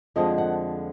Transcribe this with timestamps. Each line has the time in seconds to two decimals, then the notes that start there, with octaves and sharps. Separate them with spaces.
0.16 F2 D3 F3 G#3 D#5
0.38 F#5